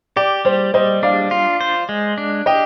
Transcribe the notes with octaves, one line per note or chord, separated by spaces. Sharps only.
G4 D5
G3 C5
G3 C5 D#5
D4 D5 F5
F4
C5
G#3
D4
G4 D#5 G5